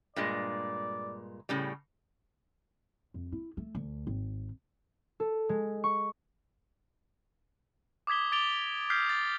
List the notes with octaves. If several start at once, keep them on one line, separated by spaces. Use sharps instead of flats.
G2 A#2 G#3 D5
A2 C#3 G3
F2
E4
A3
D2
G#1
A4
G#3
C#6
D6 D#6 G#6 B6 G7
D6 A6 D7 F7 G7
D#6 F6 G6 G#6 B6 C7
A6